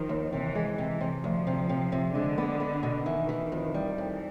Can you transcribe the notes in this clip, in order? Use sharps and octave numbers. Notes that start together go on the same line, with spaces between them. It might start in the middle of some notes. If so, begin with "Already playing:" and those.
Already playing: D#3 F3
D#2
C3 E3
G#3
C3 E3
C3
D2 F3
C3
C3
C3
D3 G#3
B3
B3
B2
D#3 E3
E3
F2
G3
F2 E3